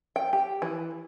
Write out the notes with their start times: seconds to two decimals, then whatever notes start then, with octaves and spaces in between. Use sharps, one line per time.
0.16 G5
0.33 G4
0.62 E3